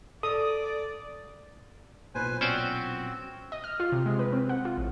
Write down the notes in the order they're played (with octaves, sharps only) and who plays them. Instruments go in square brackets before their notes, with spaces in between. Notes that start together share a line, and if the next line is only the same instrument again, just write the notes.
[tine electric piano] A4 [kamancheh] D5 [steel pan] D#6
[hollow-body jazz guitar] B1 A#2 [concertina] B4 C5 G#5
[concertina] C4 F#4 [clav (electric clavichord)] C#4 C5 D5
[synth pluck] D#5
F6
F4
C3
G#3
B4
C4
F#5
F4
A1